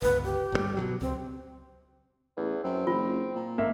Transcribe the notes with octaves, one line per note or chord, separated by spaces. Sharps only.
G1 C#2 B4
G4
G1 B2 G3
B2 D3 F#3
C#2 C4
A1 E2
F#2 C4
F#1 F4
A#2
G#1 A#3 E5